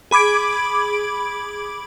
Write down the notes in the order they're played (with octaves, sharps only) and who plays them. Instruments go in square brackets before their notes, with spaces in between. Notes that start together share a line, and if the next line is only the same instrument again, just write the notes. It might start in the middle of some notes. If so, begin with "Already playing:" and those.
[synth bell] G#4 B5 D6 G#6 D7